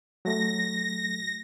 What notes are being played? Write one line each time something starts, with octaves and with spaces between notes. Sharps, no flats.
F#3 A3 A#6